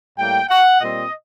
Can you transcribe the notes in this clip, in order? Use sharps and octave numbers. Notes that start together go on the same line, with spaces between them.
A2 G3 A#3 G5
F#5
A#2 G3 C4 D#5